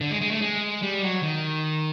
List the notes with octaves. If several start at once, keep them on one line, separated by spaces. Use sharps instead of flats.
D3
G#3
G#3
A3
G#3
G3
F#3
D#3